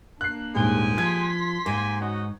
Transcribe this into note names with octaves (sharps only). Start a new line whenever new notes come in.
A#3 D4 F#6 C7
D#1 G#2 G#3 G4 G#5 G7
F3 C6 G#6 B6
G#2 A#3 G4 G#5
C#4 D#4 F#4